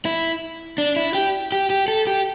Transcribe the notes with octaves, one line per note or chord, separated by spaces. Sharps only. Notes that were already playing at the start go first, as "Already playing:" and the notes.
E4
D4
E4
G4
G4
G4
A4
G4